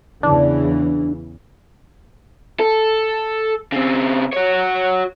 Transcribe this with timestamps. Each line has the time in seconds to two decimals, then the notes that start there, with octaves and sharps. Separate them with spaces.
0.23 E2 C#3 E3 D4
2.60 A4
3.72 C#3 C4
4.33 F#4 C#5